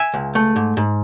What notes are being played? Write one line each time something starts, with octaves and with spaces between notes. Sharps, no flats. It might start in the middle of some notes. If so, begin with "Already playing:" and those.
Already playing: E5 G#5
C#2
A3
G#2
G#2